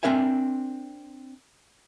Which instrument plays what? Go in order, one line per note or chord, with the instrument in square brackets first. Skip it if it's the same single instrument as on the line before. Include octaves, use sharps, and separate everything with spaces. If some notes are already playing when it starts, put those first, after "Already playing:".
[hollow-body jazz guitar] C4 D4 A#4 E5 G#5